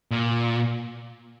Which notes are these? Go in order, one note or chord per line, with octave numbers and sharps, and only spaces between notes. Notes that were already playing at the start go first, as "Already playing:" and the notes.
A#2